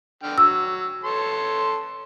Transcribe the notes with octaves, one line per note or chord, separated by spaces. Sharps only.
D3 G5 F6
F#3 E6
A4 C#5 C6